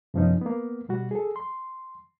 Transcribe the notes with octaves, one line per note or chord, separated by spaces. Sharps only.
F#2 C3 F3 B3 C#4 D#4
A#3 B3
B2 G3 F#4
G#4 A4
C6